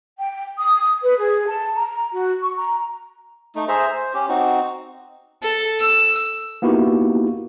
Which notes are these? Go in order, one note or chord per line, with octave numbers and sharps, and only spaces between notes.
G5
D#6
B4
G#4
A5
A#5
F#4
C#6
A#5
A3 D#4
G#4 C5 E5 A#5
C5
C#4 G4
C4 D#4 F#4
A4
E6
A#3 B3 D#4 E4 F#4 G4